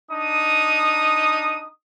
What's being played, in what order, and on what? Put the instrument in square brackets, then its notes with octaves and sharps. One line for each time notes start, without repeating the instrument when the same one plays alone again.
[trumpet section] D4 D#4 D#6